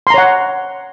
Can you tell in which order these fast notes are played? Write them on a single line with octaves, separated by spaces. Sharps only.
C6 A#5 C#5 F#5